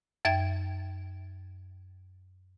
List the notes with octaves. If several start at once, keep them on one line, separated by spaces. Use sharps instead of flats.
F#2 E5 G5 G#6